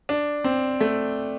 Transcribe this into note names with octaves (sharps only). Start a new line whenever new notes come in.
D4
C4
A3